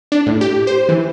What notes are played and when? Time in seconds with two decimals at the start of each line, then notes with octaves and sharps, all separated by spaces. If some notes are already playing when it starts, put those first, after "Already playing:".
0.12 D4
0.27 A2
0.41 G4
0.67 C5
0.89 E3